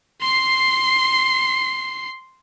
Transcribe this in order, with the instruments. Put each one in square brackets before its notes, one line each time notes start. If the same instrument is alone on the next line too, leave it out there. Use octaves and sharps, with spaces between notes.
[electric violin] C6 C7